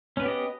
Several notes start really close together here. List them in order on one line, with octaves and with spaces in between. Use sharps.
C#4 B4 B3 G4 D#5